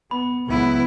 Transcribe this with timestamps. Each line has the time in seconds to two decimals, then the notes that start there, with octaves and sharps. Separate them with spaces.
0.11 B3 B5
0.46 C#2 F#3 B3 E4